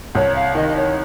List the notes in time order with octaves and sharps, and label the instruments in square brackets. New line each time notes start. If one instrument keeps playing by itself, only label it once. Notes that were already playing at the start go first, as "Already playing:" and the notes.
[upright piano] C2 [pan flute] C#5
[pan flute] F5
[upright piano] D#3 [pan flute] D#5
[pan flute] D#5
C#5